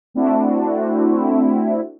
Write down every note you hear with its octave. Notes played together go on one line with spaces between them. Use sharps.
A3 C4 D4 E4 F#4